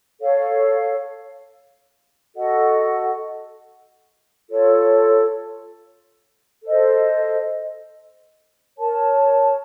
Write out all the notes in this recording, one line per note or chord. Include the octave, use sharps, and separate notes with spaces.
A4 C#5 F5
F#4 A4 D#5 F#5
F4 A4 C#5
A4 C5 D#5
A#4 C#5 A5